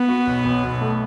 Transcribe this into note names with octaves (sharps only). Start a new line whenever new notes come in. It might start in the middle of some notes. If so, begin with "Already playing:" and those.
Already playing: B3
F#4
B1
B1
B1
A3